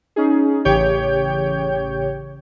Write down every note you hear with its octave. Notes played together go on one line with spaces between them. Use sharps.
C#4 D#4 G#4
A1 C#3 G4 C#5 G5 G6